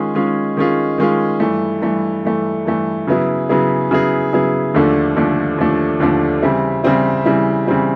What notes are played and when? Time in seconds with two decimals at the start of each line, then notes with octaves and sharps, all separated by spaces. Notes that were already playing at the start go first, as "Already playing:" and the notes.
Already playing: D#3 G#3 C#4 F4 G#4
0.14 D#3 G#3 C#4 F4 G#4
0.57 D#3 G#3 C#4 F4 G#4
0.98 D#3 G#3 C#4 F4 G#4
1.40 G2 E3 A3
1.82 G2 E3 A3
2.23 G2 E3 A3
2.65 G2 E3 A3
3.07 C#3 F#3 B3 E4 G#4
3.49 C#3 F#3 B3 E4 G#4
3.91 C#3 F#3 B3 E4 G#4
4.33 C#3 F#3 B3 E4 G#4
4.74 D#2 D3 F3 A3 D4
5.16 D#2 D3 F3 A3 D4
5.58 D#2 D3 F3 A3 D4
6.00 D#2 D3 F3 A3 D4
6.42 C#3 E3 G3 C4 E4
6.84 C#3 E3 G3 C4 E4
7.25 C#3 E3 G3 C4 E4
7.67 C#3 E3 G3 C4 E4